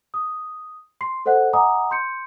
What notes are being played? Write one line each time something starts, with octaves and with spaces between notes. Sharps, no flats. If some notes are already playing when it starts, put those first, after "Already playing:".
D#6
C6 C7
A4 C5 D#5 F#5 F#6
D#5 F#5 G#5 A#5 D6 D#6
C6 G6 C#7